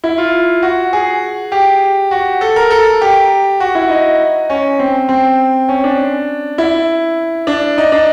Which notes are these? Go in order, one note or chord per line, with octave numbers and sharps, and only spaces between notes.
E4
F4
F#4
G#4
G4
F#4
A4
A#4
A4
G4
F#4
E4
D#4
C#4
C4
C4
C#4
D4
E4
D4
D#4
D4